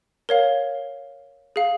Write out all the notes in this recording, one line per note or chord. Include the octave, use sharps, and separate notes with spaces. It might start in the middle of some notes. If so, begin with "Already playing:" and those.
A#4 C#5 F5
G#4 F5